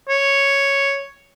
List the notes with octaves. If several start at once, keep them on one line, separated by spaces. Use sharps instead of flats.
C#5